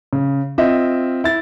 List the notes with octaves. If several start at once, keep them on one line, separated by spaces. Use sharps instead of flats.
C#3
C4 F4 D#5 E5
E4 A6